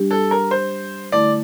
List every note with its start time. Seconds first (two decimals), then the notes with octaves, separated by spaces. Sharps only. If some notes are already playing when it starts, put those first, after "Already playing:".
Already playing: G3 D4 G4
0.11 A4
0.31 A#4
0.51 C5
1.12 D3 A3 E4 D5